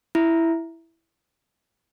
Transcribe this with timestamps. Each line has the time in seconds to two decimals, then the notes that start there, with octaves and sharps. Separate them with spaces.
0.15 E4